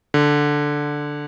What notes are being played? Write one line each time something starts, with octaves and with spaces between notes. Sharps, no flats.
D3